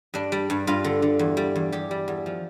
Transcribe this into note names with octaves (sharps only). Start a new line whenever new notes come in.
G2 D4
G3
G2
G2 F4
D3
D3
E2
G3
E2
E2 G4
G3
E2
F3